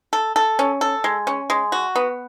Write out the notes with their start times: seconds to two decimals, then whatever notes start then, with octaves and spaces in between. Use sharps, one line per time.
0.13 A4
0.36 A4
0.59 C#4
0.81 A4
1.04 G#3
1.27 C#4
1.50 G#3
1.72 F#4
1.96 B3